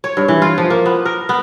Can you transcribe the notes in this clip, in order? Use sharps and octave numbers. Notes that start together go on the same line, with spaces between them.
C#5
G2
E3
F4
F3
A#3
B3
A#4
B3